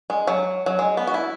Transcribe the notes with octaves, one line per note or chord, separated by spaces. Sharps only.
G#3
F#3
F#3
G#3
B3
F#4
E4